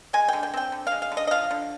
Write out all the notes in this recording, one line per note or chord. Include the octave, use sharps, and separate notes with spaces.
G#3 G#5
D3 G5
G5
C4 G5
D3
G#3 F5
F5
D3
D#5
D#5
F3 F5
D3